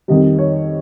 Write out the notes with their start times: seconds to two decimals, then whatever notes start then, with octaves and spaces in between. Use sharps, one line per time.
0.08 F2 D#3 G3 D#5
0.38 C#5